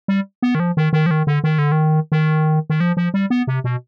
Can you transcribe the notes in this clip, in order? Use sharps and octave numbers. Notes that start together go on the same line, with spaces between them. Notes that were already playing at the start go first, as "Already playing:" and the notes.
G3
B3
D#3
F3
D#3
D#3
F3
D#3
D3
D#3
D3
D#3
D#3
D#3
F3
F3
G3
B3
C3
B2